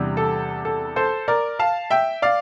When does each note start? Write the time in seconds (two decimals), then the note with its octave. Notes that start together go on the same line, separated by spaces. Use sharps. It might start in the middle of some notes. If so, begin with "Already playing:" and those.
Already playing: E2 C3 G3 D4
0.17 A4
0.65 A4
0.96 A4 C5
1.28 A#4 D5
1.59 F5 A5
1.91 E5 G5
2.22 D5 F5